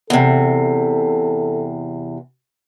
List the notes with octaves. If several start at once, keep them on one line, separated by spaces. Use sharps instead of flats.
E2 C3 A4